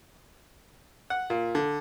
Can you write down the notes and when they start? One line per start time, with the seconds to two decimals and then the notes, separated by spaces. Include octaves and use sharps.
1.10 F#5
1.30 A#2
1.55 D3